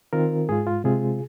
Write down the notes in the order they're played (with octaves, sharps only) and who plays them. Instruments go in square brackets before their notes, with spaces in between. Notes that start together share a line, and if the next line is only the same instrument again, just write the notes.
[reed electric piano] D#3 C4 F4 A#4
G#2 G#3 F4 G#4
F4
C3 G#3 C4 F4 G#4